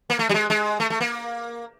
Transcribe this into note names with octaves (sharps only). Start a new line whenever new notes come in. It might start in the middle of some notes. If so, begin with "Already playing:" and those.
A#3
A3
G3
G#3
G#3
A3
A3
A#3